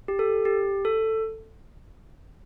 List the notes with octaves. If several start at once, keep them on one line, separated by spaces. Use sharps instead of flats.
G4
A4
G4
A4